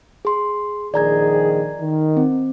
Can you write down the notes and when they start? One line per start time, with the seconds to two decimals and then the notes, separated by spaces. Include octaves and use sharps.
0.25 G#4 C6
0.94 A#1 D#3 G#4 D5 A#5 G#6
1.80 D#3
2.17 C4